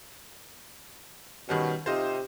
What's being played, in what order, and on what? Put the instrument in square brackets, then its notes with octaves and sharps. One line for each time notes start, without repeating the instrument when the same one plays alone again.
[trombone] B2 [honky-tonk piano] D#3 G3 C#4
[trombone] C3 [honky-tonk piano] D#4 F4 C5